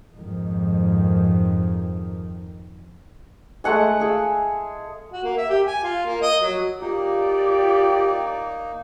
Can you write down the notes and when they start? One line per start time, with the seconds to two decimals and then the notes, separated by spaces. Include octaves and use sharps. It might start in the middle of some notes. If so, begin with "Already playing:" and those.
0.16 F2 G#2 D#3
3.64 G#3 A3 F#5 G#5
4.00 G#4 F5 E6
5.13 F#4
5.24 A#3
5.38 E5
5.50 G4
5.67 G#5
5.83 F4
6.06 A#3
6.22 D#5
6.43 F#3
6.82 A#3 D#4 F4 G4 D5